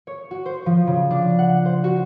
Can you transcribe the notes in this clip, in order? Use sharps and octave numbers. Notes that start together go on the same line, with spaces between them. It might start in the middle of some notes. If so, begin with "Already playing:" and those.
C#5
F#4
C5
F3
C#3
D4
F#5
C5
F#4